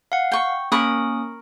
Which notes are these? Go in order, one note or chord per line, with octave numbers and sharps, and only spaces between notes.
F5 F#5
G5 C#6
A#3 C#4 A#4 B5 C#6 D#6